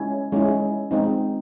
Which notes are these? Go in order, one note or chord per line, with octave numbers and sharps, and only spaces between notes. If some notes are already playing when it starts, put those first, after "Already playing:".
Already playing: G#3 C#4 E4
G#3 C#4 E4
G#3 C4 D#4